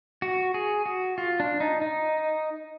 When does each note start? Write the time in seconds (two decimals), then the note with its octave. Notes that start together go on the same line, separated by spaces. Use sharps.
0.22 F#4
0.54 G#4
0.86 F#4
1.18 F4
1.40 D4
1.60 D#4
1.82 D#4